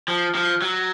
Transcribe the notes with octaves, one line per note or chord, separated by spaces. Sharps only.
F3
F3
F#3